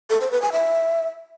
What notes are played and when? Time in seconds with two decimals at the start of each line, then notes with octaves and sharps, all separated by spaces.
0.10 A4
0.21 C5
0.31 B4
0.42 G#5
0.52 E5